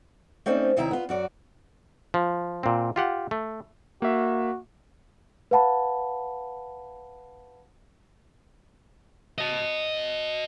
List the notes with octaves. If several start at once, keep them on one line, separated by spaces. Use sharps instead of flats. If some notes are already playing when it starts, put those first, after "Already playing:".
A3 C4 C#4 D#4 C5 D5
D#2 C3 D#3 E4 E5 A#5
B3 F4
F#2 F#4 D5
F3
A#2 C4
F4 G4 F#5
A3
A#3 F#4 E5
B4 F5 F#5 A5 B5
D#5 A5